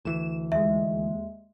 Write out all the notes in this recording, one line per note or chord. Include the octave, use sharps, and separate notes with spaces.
D2 E3 E7
D#2 G#3 E5